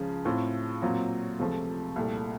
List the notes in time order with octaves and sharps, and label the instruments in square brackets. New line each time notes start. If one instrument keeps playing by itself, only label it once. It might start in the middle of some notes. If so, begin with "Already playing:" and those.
Already playing: [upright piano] C#2 C#3 F3
A2 A3 C4 F4
A#2 F#3 C4 F4
C#2 C3 F3 A3
C2 A#2 A3